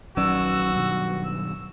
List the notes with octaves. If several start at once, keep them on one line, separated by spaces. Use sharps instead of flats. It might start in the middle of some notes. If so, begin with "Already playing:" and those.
A#1 D#3 F#3 C#4 F#4 B4 D5 E6
G2 B2 D#3
E6